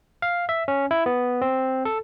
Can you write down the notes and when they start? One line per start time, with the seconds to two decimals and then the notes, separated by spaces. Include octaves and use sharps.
0.22 F5
0.49 E5
0.68 C#4
0.91 E4
1.06 B3
1.42 C4
1.85 A4